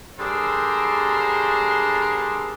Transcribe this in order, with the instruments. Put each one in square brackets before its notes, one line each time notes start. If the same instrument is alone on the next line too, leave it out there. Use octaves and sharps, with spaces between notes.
[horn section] D3 G3 D4 G#4 A#4 C5